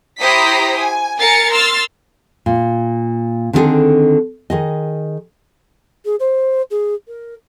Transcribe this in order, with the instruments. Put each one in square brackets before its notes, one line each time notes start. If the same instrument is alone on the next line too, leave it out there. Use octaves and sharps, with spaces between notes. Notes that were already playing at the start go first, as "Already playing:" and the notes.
[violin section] E4 G4 C5 A#5 D#6 B6
G#5
A#4 G#5 A6 C7 C#7
C6 E6 F6 A6
[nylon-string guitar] A#2
D3 D#3 C4 E4 G#4 A4
D#3 G#4 D#5
[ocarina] G#4
C5
G#4
A#4